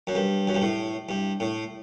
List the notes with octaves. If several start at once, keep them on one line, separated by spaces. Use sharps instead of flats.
F#2
G2
F#2
G2
A2
G2
A2